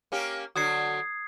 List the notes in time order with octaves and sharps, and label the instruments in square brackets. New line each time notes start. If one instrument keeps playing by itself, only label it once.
[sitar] A#3 C#4 G4
[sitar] D3 F#3 F#4 [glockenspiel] D#6 G#6 C7